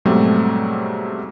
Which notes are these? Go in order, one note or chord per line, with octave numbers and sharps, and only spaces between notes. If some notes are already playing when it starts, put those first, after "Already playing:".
G#2 B2 F#3 G3 A3 C4